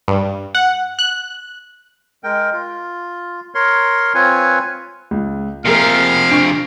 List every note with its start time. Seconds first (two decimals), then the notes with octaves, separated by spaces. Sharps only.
0.08 G2
0.55 F#5
0.99 F#6
2.24 G#3 A#4 G5
2.53 F4
3.55 A#4 C#5 C6
4.15 C4 F4 B4 C#5 G#5
5.11 C#2
5.65 C3 F3 A#3 G#4 A#4 F5
6.31 D4 C#6 D7